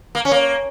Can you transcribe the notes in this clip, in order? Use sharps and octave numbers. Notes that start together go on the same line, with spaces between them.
A#3
C#4
A#3